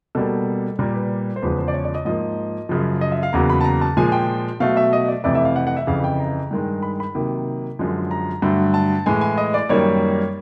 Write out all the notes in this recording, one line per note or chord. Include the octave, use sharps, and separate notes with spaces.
B2 G3 A#3 A4
A#2 G3 A#3 A#4
B4
C5
E2 C#3 F3 G#3 B4
C5
D5
C#5
D5
D#5
G#2 F3 A#3 D#5
F#2 C#3 F3
D#5
E5
F5
E2 C#3 F#3 A#3 A#5
B5
A5
A#5
A5
A#2 F3 G#3 G#5
G#5
G5
B2 F#3 A3 F5
E5
D#5
D5
F2 C3 E3 A3 D5
E5
F5
F#5
F#5
E5
F2 C#3 E3 F5
G5
A#5
G2 D#3 G#3
B5
B5
C3 D#3 F#3 A#3
F#2 D3 F3 G#3
A#5
G2 D3 F#3 A3
A5
A2 E3 G#3 G#5
G#5
D#5
D5
F#2 D#3 G3 A#3 C#5